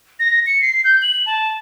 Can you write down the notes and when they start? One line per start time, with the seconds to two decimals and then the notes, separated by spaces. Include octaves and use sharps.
0.20 A#6
0.46 C#7
0.62 C7
0.84 G6
1.02 F#7
1.26 A5